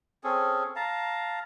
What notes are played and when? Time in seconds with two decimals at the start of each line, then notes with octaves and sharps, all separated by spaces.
0.24 C4 C#4 G#4 A4
0.76 F5 A5 A#5